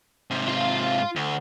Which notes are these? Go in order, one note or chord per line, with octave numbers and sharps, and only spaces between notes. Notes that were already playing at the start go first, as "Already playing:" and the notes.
G#2 C3
F4
D2